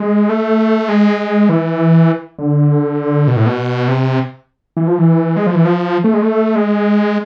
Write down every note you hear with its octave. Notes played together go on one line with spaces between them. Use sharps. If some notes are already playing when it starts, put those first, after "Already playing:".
Already playing: G#3
A3
G#3
E3
D3
B2
A2
B2
C3
E3
F3
E3
G#3
F3
E3
F3
A3
G#3
A3
G#3